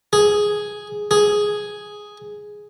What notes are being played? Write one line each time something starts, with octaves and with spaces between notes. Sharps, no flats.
G#4
G#4